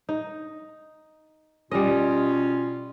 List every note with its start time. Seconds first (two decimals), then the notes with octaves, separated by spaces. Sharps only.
0.09 D#4
1.71 B2 G3 C#4 F4 D#5